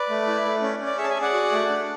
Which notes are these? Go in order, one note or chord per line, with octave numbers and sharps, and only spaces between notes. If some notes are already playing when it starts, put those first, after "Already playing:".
Already playing: B4 D5
A3
E4
A3
C#4
C#4
D5
G#4 C#5 E5
A5
E5 G#5
G#4
D5 F#5
F#4
A3
D4